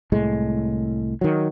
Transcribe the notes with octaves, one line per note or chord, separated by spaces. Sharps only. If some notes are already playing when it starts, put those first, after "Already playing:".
C2 A2 G#3
D#3 F#3